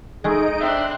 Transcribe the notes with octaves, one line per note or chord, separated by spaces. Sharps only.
G#3 A3 D#4 G#4 D#5 D7
C4 D4 E5 F#6